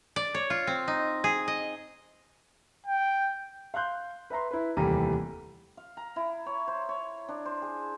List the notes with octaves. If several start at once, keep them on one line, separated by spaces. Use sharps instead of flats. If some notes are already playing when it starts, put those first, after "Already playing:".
D5
C#5
F4
C4
D#4
G#4
D#5
G5
F5 C6 F#6 G6
B4 E5 A#5 C6
E4 B4
F1 D#2 E3 G3 A#5 D#7
F5
A#5
E4
C#5
C5
C#5
D4
C5
G#4